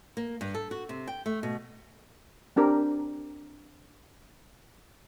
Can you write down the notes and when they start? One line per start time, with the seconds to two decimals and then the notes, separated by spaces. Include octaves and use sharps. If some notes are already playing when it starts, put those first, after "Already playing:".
0.17 A#3
0.41 G2
0.55 A4
0.71 F#4
0.89 C3
1.08 G5
1.26 A3
1.43 B2
2.56 C4 D4 G4 A#4